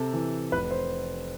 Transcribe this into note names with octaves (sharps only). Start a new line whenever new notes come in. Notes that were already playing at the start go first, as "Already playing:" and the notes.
Already playing: C3 A4
E3
F1 B4
C5